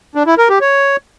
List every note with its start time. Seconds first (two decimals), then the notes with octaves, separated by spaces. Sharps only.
0.15 D4
0.27 E4
0.38 A#4
0.50 G4
0.61 C#5